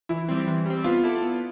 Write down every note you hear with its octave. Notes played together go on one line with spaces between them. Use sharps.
E3 E4
G3 C4
E3
G3 C4
B3 F4
E4 A4 D5
B3